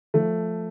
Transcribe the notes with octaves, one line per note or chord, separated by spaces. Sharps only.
F3 A3